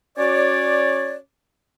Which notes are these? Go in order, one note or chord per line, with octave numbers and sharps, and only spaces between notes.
C#4 F#4 C#5 D5